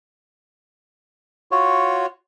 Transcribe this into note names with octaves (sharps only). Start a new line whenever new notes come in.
F4 F#4 C#5